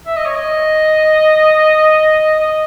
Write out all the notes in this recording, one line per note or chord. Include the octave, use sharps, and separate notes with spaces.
E5
D#5
C#5
D#5
D#5